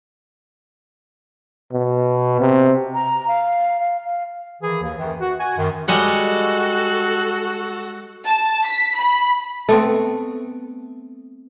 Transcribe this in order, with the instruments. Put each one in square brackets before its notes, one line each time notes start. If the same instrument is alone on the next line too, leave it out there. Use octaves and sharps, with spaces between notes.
[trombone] B2
C3
[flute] A#5
F5
F5
F5
[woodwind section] D#3 E3 G#4
D#2
F#2 D#3 E3
F#4
F#4 G#5
F#2 D#3
[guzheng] G3 G#3 F#5 [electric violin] F#4 A4
[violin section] A5
B6
B5
[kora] A3 B3 C4